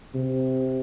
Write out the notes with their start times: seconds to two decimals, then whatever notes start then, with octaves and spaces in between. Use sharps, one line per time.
0.14 C3